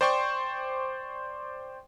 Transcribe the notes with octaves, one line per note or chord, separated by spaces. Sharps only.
C5 D5 G5 C6 C#6